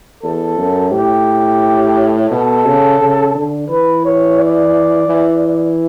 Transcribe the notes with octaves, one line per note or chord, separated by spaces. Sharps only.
E2 A4
F#2
A2 G4
B2 A4
C#3
C#3
D3
E3 B4
C#5
D5
E3